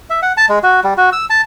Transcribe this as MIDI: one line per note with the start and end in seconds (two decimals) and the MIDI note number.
0.10 0.20 76
0.22 0.33 78
0.37 0.46 81
0.49 0.59 56
0.63 0.80 66
0.84 0.94 55
0.97 1.10 66
1.12 1.25 88
1.30 1.42 81